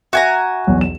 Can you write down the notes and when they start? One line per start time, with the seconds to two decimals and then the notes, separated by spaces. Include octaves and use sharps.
0.13 F#4 E5 G#5 A#5
0.67 B1 E2
0.81 E7